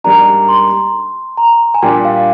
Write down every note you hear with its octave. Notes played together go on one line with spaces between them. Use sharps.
G#2 G3 A#3 D4 A#5
C6
A#5
G#5
A#2 G3 D4 G4 G5
F5